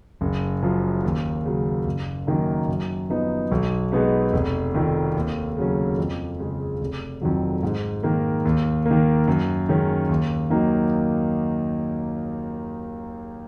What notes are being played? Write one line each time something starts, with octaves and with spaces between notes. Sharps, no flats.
F#1
F#2 F3
D#2
C#3 F#3
F#1
F#2 D#3 A#3 D#4
F#2
F3 B3 D#4
B1
B2 G#3 B3 D#4
F1
F2 D#3
D#2
C#3 F#3 C#4
F2
C#3 G#3
F1
F2 D#3 F#3
G#2
D#3 A#3
D#2
A#3
D#3
F#2
D#3 G#3 C#4
D#2
D#3 F#3 A#3 D#4